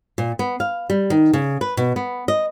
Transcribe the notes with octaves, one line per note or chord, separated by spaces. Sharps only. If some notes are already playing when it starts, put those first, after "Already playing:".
A#2
B3
F5
G3
D#3
C#3
B4
B2
B3
D#5